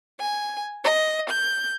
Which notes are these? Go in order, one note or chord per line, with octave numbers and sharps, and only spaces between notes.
G#5
D#5
G6